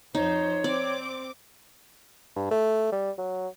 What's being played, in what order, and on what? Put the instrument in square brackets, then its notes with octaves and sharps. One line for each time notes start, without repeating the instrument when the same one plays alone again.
[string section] F2 C5 [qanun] D#4 [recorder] C#5
[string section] C4 D6 [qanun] D5
[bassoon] G2
A3
G3
F#3